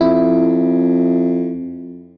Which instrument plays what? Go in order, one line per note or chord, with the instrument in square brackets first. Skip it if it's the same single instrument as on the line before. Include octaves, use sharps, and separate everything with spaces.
[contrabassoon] F2 [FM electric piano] E4